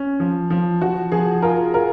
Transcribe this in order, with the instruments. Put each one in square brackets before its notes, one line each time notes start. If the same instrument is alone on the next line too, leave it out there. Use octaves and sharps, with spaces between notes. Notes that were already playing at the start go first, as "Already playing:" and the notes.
Already playing: [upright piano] C#4
F3
F3
[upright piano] F3 [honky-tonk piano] F#4
[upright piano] F3 [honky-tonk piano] G#4
[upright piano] F4 [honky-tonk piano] A#4
[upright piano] F4 [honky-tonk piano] A#4